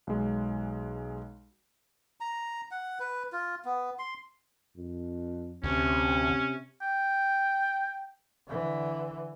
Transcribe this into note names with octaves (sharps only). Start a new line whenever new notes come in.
B1 G#3
A#5
F#5
B4
F4
B3
C6
F2
D2 C3 C#4
G5
D3 E3